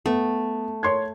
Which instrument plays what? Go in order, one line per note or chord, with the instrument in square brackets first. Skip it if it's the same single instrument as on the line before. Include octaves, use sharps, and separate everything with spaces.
[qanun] A3 [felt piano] B3
[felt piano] C#5 C6 G#6